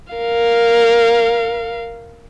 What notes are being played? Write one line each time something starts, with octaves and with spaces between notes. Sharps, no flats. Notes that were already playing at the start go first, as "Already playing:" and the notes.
A#4 F5